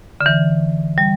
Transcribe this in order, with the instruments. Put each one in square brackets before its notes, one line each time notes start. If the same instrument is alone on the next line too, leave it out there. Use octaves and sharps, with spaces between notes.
[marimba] D3
E3
G3